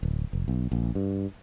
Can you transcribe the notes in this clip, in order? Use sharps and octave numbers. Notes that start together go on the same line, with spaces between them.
D1
F1
B1
A#1
G2